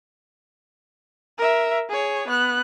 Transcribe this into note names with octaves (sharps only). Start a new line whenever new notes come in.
A#4 E5
G#4 C#5
B3 F#6